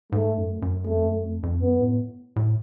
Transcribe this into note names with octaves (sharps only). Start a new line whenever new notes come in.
G#2 A3
F#2
F#2
F2 A3
F#2
F2
F2
F#2 B3
A2
A2